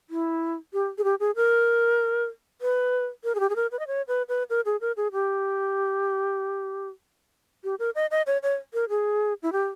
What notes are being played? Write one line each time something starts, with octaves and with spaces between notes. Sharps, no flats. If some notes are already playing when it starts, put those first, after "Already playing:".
E4
G4
G#4
G4
G#4
A#4
B4
A#4
G#4
G4
G#4
A#4
B4
D#5
C#5
B4
B4
A#4
G#4
A#4
G#4
G4
G4
A#4
D#5
D#5
C#5
C#5
A#4
G#4
E4
G4